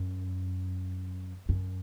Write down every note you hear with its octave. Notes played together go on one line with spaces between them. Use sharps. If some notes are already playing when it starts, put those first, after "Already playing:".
Already playing: F#2
F#2